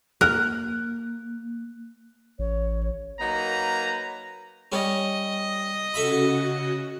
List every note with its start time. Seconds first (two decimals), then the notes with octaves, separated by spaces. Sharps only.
0.21 A#3 A#4 F#6
2.39 A1 C#5
3.20 F#3 A#3 D#4 B4 A#5
4.72 G3 C#4 D#5
5.94 C#3 F#4 A4 E5 B5